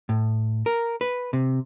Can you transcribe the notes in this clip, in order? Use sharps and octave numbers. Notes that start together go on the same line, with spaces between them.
A2
A#4
B4
C3